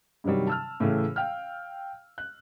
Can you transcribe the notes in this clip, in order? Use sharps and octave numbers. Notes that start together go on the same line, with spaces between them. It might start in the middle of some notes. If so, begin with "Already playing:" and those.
G2 C3 D#3 F#3 G3
A5 E6 F6
A2 C#3 E3 A3
F5 G5 F6
F#6